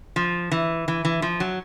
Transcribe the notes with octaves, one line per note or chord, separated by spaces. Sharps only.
F3
E3
E3
E3
F3
F#3